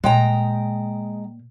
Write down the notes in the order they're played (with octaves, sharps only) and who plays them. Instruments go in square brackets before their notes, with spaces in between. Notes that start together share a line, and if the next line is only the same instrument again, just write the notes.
[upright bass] A#2 [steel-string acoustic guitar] G#3 G5 A#5